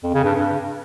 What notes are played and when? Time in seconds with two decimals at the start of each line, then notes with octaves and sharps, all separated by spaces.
0.03 F2
0.14 C#3
0.24 G2
0.35 G2